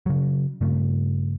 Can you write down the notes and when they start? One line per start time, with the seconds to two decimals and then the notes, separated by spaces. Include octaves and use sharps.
0.06 C#3 F#3
0.61 G2 C#3 A3